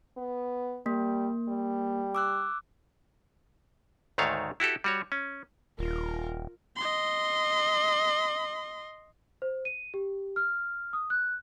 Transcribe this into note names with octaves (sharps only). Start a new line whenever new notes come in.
B3
G3 A#3
G3
D6 E6 F#6
D2 G#2 D#3 A3 C#5 F5
E4 F#4 G4 A4
G3 F#4 C#5
C#4
D#1 F4 A#4
D#5 C6
C5
D#7
G4
F6
D#6
F#6